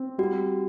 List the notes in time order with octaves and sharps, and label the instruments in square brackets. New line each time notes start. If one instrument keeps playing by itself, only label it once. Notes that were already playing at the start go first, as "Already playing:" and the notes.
Already playing: [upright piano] C4
[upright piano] G3 [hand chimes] F#4